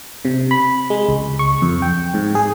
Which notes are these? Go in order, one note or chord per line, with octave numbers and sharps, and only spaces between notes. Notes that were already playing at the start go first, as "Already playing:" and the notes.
C3
B5
G#3
C#2
C#6
F2
G5
G#2
G#4